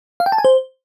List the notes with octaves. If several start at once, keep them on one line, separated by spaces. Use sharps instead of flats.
F5
G5
A5
G#5
C5